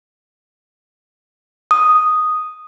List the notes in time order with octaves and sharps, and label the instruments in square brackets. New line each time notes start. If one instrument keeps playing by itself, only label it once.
[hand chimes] D#6